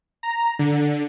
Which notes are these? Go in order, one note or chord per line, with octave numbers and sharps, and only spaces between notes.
A#5
D3